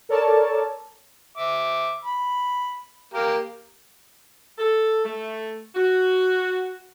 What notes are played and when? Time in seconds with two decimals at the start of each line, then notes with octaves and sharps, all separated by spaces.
0.09 A4 A#4 C#5 D5 A5
1.37 E5 D6
2.05 B5
3.13 A#3 G4 A#4
4.58 A4
5.04 A3
5.75 F#4